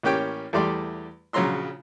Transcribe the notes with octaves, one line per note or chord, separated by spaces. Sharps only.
A1 A#3 C#4 G4 G5 C#6
E2 G3 A3 G4 D5 C6
A#1 C#3 F#3 A#5 C6 E6